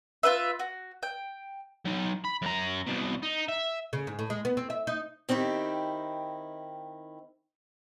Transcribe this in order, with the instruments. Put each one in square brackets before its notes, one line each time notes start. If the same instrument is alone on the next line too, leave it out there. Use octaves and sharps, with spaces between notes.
[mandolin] F4 G4 B4 E5
F#4
G5
[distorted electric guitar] F#3 D#4
B5
F#2 A#5
C2 B2
D#4
E5
[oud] C#3
G#2
A2
G#3
B3
C4
E5
D#4
[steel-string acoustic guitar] D#3 C4 D#4 E4 G4